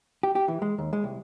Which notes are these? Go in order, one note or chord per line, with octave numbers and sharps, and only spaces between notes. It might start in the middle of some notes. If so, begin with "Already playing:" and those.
G4
G4
E3
G#3
D#2
G#3
C2